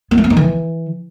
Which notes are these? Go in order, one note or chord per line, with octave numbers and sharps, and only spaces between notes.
B3
A3
B3
D#4
E3